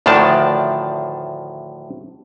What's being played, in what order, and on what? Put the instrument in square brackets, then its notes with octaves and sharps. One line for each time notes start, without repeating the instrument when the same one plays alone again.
[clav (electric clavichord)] D2 A2 D#3 F3 D4 A5